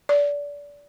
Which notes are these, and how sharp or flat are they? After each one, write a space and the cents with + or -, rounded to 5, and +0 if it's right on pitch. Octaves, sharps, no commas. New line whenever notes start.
D5 -25